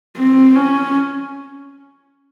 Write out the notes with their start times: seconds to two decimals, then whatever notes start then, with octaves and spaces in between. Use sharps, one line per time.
0.17 C4
0.56 C#4